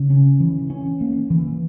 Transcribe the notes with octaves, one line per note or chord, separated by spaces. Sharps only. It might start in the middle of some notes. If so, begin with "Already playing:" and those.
Already playing: C#3
C#4
E3
C#4
A#3
E3